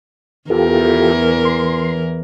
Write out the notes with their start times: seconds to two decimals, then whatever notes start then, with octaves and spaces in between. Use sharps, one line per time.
0.50 E2 E3 F4 G4 A4 A#4
1.45 C6